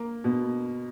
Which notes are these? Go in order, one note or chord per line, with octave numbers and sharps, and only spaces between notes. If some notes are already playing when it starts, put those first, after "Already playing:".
Already playing: A#3
B2